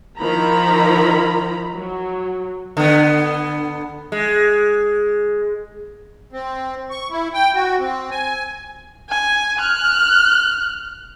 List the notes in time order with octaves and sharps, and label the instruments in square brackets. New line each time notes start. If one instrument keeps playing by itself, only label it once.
[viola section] D#3 F3 E4 A#5 B5
F#3
[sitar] D3 B3
G#3
[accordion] C4
C#6
E4
G5
F#4
C4
G#5
[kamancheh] G#5
F6 F#6